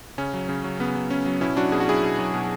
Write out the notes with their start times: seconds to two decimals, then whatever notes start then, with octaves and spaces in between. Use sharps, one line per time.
0.18 C#3 C#4
0.34 F#3
0.49 C#3
0.64 F#3
0.80 C#3 B3
0.95 F#3
1.10 C#3 C#4
1.26 F#3
1.41 B2 C#4 E4
1.56 F#3 D4 F#4
1.72 B2 G#4
1.80 F#4
1.87 F#3 E4 G#4
2.03 B2
2.19 F#3
2.34 B2